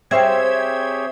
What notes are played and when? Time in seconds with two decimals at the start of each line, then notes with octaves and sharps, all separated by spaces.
0.11 C4 G4 G#4 C5 C#5 E5 F5 G#6